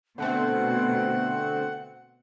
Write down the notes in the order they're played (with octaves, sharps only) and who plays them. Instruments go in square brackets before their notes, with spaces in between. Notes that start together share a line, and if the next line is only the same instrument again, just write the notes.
[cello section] B2 [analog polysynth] D3 A3 C4 [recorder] F#5